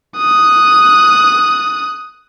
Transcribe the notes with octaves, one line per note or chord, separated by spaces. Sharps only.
D#6 F#6